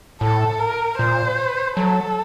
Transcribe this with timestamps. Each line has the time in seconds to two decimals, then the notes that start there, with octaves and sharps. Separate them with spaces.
0.21 A2 A4
0.60 A#4
0.99 A#2 C5
1.77 F#3 A4